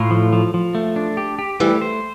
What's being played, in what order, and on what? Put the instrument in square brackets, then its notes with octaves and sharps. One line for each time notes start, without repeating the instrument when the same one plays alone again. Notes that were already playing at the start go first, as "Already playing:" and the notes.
Already playing: [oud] A2 [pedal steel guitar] F4
[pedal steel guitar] F3
F3
F3
A3
D4
G4
G4
[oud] E3 G3 [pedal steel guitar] A3
[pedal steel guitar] C5